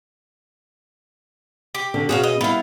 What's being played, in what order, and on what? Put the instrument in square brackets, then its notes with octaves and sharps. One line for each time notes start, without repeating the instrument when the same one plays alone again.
[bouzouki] G4
[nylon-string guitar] D3 C#4
[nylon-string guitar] B2 C#4 G#4 [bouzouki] F#4 C#5 F5
[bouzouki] D#5
[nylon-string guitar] G3 E4 [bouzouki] B3 F5